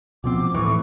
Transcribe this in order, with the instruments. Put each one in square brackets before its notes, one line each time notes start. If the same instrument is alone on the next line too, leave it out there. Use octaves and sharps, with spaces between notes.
[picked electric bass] B2 F3 C4 [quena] D6
[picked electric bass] A2 A3 [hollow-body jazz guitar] E3 [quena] C#6